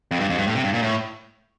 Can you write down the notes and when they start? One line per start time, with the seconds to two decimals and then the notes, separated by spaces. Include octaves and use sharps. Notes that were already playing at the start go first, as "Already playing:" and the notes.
0.11 F2
0.20 G2
0.29 F2
0.38 G2
0.47 A2
0.55 C3
0.64 G2
0.74 A#2
0.82 A2